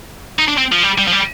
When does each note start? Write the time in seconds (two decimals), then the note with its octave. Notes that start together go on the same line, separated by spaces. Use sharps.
0.39 D#4
0.48 D4
0.58 C4
0.72 F3
0.83 G3
0.98 G3
1.07 F3
1.12 G3